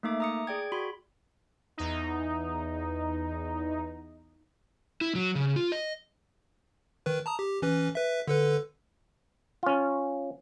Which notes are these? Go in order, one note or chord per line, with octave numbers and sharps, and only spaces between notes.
A3 A#3 D#4 E5 D6
A#5 D#6 C#7
G#4 D5 G5 G#6
F#4 B5 C6
E2 D#4
E4
F#3
C#3
F4
D#5
D#3 B4
A5 A#5 D#6
G4
E3 C#4 B4
B4 E5
D3 A4 B4
C#4 F4